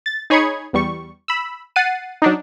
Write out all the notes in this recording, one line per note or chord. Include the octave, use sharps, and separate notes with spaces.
A6
D#4 G#4 C#5 B5 G#6 C#7
E2 G3 C#6
B5 E6
F#5 A6 C7 D#7
F#3 D4 D#4